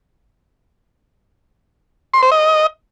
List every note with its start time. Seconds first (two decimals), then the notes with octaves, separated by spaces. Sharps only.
2.14 C6
2.23 C5
2.32 D#5